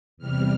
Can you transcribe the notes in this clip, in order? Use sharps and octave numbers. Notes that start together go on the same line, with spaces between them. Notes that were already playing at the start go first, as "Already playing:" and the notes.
E2 C3 G3 F6